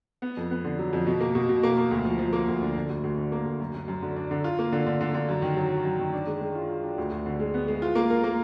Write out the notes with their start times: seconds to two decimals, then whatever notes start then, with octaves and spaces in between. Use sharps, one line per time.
0.22 B3
0.37 F2
0.51 B3
0.64 D3
0.79 F#3
0.93 F2
1.07 B2
1.21 A#3
1.35 B2
1.49 B2
1.63 A#3
1.78 A#3
1.91 D2
2.05 F3
2.19 F3
2.33 A#3
2.48 D2
2.62 D3
2.76 D3
2.90 D2
3.04 D2
3.18 D3
3.32 A#3
3.45 D2
3.60 F#2
3.74 F#2
3.88 F#2
4.02 D3
4.16 D4
4.31 D3
4.44 F4
4.59 A#3
4.72 D3
4.86 D3
5.01 D3
5.14 D3
5.29 F#2
5.42 D#3
5.56 F#3
5.71 F#3
5.85 F#2
5.99 D#3
6.14 D4
6.27 G#3
6.41 G#3
6.55 F4
6.69 F4
6.83 D4
6.98 D2
7.12 D2
7.26 D3
7.40 G#3
7.54 B3
7.68 G#3
7.82 F4
7.95 A#3
8.10 A#4
8.24 A#3